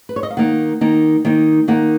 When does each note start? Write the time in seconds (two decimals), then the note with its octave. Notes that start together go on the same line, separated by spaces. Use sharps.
0.09 B4
0.16 C#5
0.23 D#5
0.30 F5
0.37 D#3 A#3 D#4 F#5
0.81 D#3 A#3 D#4
1.25 D#3 A#3 D#4
1.68 D#3 A#3 D#4 F#5